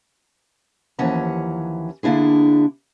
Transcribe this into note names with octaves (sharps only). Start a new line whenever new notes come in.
D#2 E3 F3 C#4 F#5 A#5
D3 A#3 D4 E4 G#4